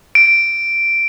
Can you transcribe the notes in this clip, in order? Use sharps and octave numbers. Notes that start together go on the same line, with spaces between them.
D7